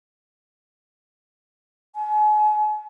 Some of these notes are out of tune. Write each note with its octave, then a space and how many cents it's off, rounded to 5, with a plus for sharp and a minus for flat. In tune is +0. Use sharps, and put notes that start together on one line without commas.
G#5 +40